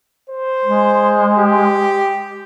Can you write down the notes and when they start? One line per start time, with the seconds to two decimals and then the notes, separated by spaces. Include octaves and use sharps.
0.30 C5
0.65 G#3
1.38 G4